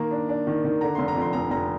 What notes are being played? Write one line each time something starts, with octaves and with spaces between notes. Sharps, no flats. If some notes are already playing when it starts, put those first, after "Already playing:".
Already playing: D#3 A#3 A#5
D4
D4
D#3
D#3
D3 A#5
F1 C6
A#5
F2
C6
F1 A#5
F1 A#5